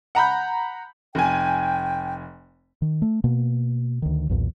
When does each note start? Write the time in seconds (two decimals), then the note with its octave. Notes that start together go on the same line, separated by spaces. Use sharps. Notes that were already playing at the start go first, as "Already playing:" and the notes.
0.15 F#5 A#5 B5 G6
1.15 F1 G5 G#5
2.82 D#3
3.02 A3
3.24 B2 A#3
4.02 D2 D#3
4.29 B1 E2 A#2